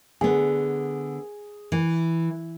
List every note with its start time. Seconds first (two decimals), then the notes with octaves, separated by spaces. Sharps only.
0.21 D3 B3 G#4
1.72 E3